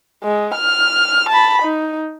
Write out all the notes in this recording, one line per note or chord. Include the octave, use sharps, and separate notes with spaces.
G#3
F6
A5 B5
D#4